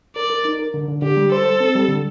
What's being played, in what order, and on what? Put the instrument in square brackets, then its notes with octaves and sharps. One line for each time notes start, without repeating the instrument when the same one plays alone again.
[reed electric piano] A#4 [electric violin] D5
[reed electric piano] A#4
D#4
A#4
D3
D3
[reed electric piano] D3 [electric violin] G4
[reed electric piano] G3
[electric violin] A4 [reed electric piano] C5
[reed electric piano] C5
C4
G3
D3